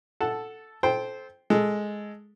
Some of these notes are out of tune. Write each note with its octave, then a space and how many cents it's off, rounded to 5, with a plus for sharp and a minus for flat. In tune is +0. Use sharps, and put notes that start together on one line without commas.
A4 +0 F#5 +0 A5 -10
A4 -25 C5 +0 G5 +0
G#3 +5 A4 +0